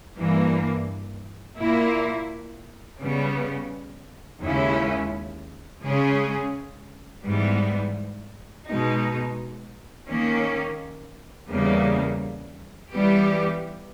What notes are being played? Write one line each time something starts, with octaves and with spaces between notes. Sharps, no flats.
G2 E3 A#3
A#2 A#3 E4
C#3 G3 B3
D#2 C#3 G#3 C#4 E4
C#3 G#3 C#4 G#4
G#2 E3 G3 B3
B2 G#3 D#4
D#3 A#3 C#4
E2 C#3 G3 A#3
E3 G3 B3 G4